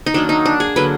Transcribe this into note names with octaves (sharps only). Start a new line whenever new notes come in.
D#4
D#3 F#3 A#3 D4
D#4
D4
G#4
D3 F#3 A#3 B4